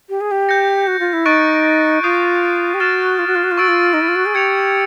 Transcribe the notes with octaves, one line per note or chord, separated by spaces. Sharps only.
G4
G#4
G4
G6 A#6 C#7
F#4
F4
E4
D#4 C#6 F#6 A6 D7
F4 D#6 G6 C7 D#7
G4
F#4 F6 A6 C7 E7
F4
F#4
F4
F#4
F4
F#4 C#6 E6 A6 D7
F4
D#4
E4
F4
F#4
G#4
G4 G#6 C#7 F7